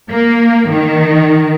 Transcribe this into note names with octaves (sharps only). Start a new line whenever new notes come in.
A#3
D#3